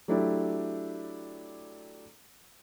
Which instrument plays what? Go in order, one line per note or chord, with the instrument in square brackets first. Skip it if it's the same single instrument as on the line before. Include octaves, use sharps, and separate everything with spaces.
[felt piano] F#3 A3 D4 E4 G4 D5